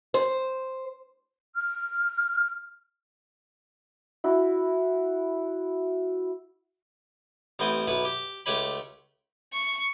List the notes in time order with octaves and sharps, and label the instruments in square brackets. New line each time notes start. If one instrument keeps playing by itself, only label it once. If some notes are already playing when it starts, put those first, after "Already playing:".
[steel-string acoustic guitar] C5
[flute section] F6
[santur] E4 F#4
[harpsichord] A1 B3 C4 E4 C5 G#5
B1 B3 E4 B4
G4
C#2 A3 G4 C#5 G#5 B5
[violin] C#6